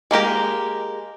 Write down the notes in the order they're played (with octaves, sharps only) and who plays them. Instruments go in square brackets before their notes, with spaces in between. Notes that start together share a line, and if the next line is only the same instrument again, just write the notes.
[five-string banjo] G#3 A#3 G4 A#4